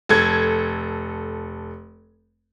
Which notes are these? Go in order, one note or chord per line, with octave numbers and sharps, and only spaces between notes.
F1 A4 G#6